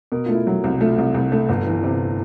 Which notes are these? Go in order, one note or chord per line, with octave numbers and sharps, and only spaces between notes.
B2 A#4
A3 F4
E4
F#3
C2
A3 F4
C2
C2
A3
G1
E3
C3